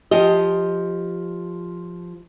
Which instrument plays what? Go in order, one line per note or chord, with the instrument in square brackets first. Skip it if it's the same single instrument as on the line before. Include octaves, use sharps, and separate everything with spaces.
[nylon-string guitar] F3 G4 D#5